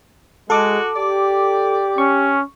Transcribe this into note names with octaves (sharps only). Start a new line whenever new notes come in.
G#3 F#4 A4 D6
G4 D5
C#4 C#6